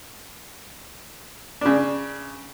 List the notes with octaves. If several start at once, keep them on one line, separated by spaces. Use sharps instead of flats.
C#3 D4